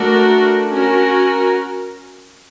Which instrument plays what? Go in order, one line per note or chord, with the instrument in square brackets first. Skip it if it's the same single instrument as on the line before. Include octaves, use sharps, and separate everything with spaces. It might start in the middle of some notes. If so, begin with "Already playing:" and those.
Already playing: [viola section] A3 D4 F#4 A#4
C#4 F#4 A#4